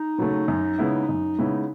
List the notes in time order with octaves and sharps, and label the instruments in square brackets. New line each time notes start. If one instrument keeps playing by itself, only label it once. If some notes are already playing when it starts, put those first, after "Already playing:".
Already playing: [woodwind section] D#4
[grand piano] C#3 F#3 A3
F#2
C#3 G#3 B3 E4
F#2
C#3 G#3 B3 E4